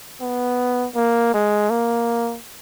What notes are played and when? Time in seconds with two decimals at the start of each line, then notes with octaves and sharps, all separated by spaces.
0.21 B3
0.95 A#3
1.34 G#3
1.70 A#3